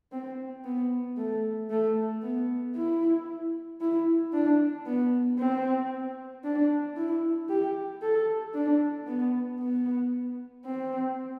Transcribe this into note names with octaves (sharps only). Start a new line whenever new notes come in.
C4
B3
A3
A3
B3
E4
E4
D4
B3
C4
D4
E4
G4
A4
D4
B3
B3
C4